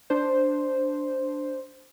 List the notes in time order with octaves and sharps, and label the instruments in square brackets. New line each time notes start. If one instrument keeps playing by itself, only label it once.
[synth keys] D4 C5